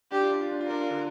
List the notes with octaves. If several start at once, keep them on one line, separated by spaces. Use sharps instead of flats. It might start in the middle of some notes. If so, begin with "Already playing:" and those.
D4 G4
F4
D4
F4
D4
F4
D4 A#4
F4
D3 D4